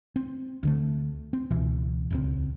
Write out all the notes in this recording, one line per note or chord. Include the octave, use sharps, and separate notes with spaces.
C4
D2 D3 A3
C4
C#2 B2 E3
D#1 C#2 C4